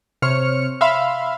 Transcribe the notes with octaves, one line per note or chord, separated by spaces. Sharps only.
C3 C5 C#5 F6 C#7
E5 F5 B5 C6